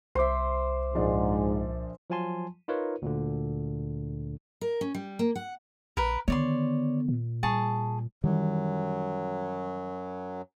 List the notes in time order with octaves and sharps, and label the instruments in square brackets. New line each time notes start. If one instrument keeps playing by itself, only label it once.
[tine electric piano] C2 D6 [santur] C5 E5 [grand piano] C7
[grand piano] A#1 F3 D4 [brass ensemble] G#2
[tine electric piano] F3 F#3 F4 G#5 A5 C6
D#4 F4 A#4 B4 C#5
D2 A#2 D3
[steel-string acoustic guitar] A#4
C#4
G3
A#3
F#5
[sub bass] A#1 [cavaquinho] A#4 B4
[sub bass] D3 [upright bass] D#3 B3 [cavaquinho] C#5 D5 C6
[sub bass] A#2
[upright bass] G3 [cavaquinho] G#4 A5 C#6
[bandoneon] F#2 F#3 [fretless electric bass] D#3 E3 G3